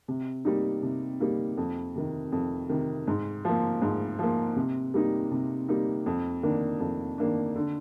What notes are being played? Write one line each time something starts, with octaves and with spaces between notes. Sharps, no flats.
C3
G3 A#3 D#4
C3
G3 A#3 D#4
F2
C3 D#3
F2
C3 D#3
G#2
F3 A#3
G#2
F3 A#3
C3
G3 A#3 D#4
C3
G3 A#3 D#4
F2
D#3 A#3 D4
F2
D#3 A#3 D4
D3